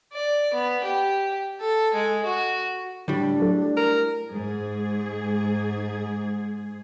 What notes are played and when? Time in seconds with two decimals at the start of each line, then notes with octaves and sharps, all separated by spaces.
0.13 D5
0.54 B3
0.84 G4
1.60 A4
1.94 G#3
2.25 F#4
3.08 A2 D3 G3 D4
3.40 F#3 A4
3.77 A#4
4.31 G#2 G#4